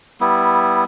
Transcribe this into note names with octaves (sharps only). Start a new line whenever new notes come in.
G3 B3 E4